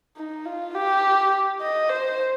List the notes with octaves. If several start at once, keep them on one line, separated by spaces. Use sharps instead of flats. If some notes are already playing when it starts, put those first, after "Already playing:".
D#4
F4
G4
D#5
C5